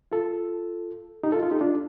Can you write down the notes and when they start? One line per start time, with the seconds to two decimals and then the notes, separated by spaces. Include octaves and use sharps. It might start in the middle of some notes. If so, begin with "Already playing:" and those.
0.12 F4 A4
1.23 D#4 G4
1.32 F4 A4
1.42 F4 A4
1.51 D#4 G4
1.61 D4 F4